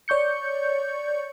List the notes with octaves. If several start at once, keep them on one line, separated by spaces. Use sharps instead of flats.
C#5 D5 C#6 G6 C#7